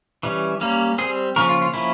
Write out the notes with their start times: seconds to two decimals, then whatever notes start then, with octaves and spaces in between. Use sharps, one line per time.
0.23 E3 G3 C#4
0.61 G3 A#3 C#4
0.98 G3 C4 G#4
1.36 C#3 F3 A#3 C#4 A#4
1.49 F4
1.62 F4
1.74 F3 A#3 C#4 E4